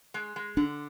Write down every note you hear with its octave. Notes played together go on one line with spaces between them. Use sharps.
G#3
G#3
D3 D4